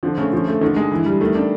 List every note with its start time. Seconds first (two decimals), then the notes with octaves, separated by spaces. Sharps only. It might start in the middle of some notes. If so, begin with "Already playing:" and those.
0.03 D3 F3
0.17 C#3 A3
0.32 C#3 F3
0.47 A3
0.61 D3 D#3
0.76 G#3
0.92 E3
1.06 G3
1.21 D#3 A3
1.35 D4